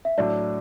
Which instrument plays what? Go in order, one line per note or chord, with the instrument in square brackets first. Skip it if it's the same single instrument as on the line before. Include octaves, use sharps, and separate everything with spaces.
[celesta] E5
[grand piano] A2 F#3 A3 D4 [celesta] D5